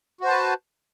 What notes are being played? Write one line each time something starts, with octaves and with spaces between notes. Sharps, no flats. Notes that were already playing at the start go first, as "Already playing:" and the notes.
F#4 B4 C5 A5